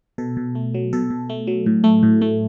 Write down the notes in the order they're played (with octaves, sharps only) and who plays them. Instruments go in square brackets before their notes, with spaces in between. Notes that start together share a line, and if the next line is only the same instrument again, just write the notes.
[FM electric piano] B2 A4
B2
A3
F#3
B2 A4
B2
A3
F#3
A2
A3
A2
A3